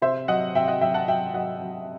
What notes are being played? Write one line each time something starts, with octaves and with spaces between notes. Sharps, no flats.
C3 C5 E5
F#3 D#5 F#5
C3 E5 G5
D#5 F#5
F#3 E5 G5
F#5 A5
F#3 E5 G5
F#3 D#5 F#5
F#3